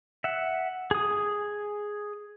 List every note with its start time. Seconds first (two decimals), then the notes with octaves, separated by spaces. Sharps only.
0.24 E5 F#5
0.91 G#4 D#6